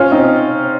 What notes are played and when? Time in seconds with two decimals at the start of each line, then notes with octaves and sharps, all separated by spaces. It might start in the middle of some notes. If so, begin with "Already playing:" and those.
Already playing: C#4 F4
0.12 C4 D#4